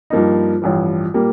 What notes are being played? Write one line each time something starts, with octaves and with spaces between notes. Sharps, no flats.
G2 F3 A#3 D#4
A1 G2 F3
A#2 G3 A#3